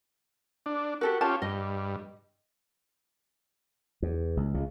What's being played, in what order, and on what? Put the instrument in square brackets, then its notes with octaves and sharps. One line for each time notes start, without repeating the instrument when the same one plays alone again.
[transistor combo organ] D4
[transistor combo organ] F#4 [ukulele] G4 A4 A#4
[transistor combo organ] C#4 F4 G4 [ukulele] A5
[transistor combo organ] G2 [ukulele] D#5
[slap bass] E2
C#2
C#2 C#3